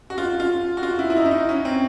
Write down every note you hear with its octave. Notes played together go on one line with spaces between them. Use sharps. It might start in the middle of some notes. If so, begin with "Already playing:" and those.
F#4
F4
F4
F#4
F4
E4
E4
D#4
E4
D#4
C#4
C4